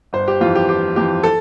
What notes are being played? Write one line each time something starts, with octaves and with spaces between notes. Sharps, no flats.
G1 C5
G4
F2 E3 F4
G4
G1 G4
F2 E3 G4
A4